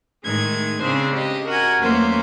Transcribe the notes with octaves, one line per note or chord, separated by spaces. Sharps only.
A2 D#3 G#3 G#6
C#3 C4 D4 G#4 C5
G4 D#5
F#4 A#4 F#5 G#5
E2 F#3 A3 A#3 C#4 C5